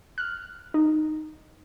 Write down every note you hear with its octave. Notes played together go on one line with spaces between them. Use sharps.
F6 F#6
D#4